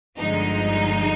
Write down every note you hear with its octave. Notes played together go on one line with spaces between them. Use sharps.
G1 G2 D3 F3 G#3 D#4